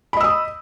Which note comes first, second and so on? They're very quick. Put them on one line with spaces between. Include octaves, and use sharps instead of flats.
B5 D#5 E6 D#6